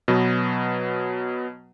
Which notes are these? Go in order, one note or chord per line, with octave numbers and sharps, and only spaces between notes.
B2 F#3 B3